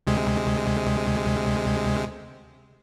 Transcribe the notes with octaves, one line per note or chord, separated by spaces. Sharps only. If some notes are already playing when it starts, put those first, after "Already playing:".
D2 C3 G#3